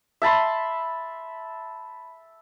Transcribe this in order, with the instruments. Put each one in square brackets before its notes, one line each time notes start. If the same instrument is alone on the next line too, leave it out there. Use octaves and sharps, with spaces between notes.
[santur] E5 A5 B5 C6